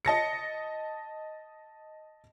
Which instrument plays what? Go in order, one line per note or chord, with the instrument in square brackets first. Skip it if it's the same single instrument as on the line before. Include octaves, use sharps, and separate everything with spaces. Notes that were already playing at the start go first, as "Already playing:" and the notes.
[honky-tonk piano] D#5 A5 A#6 C#7